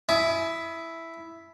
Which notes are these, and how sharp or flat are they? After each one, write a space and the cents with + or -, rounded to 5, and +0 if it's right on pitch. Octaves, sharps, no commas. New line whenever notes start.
E4 +0 G#5 +30 D#6 +15